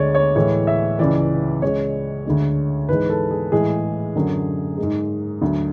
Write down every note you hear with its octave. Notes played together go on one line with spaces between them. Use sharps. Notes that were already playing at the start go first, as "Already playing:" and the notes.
Already playing: D2 D3 G#3 C#5 D5
C#5
A2 E3 G#3 C#5
E5
C#2 C#3 E3 D5
C#2 C#3 G#3 C#5
D2 D3 G#3
G#2 E3 G#3 B4
A4
G#4
A2 E3 G#3 G#4
F#2 D3 F#3
G#3
G#2
D2 D3 F#3